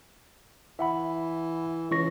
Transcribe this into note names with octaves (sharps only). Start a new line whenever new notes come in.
E3 E5 F#5 B5
C#2 E3 C#6 A#6